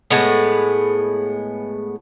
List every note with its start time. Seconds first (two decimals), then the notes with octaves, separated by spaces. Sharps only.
0.10 A2 G#3 B3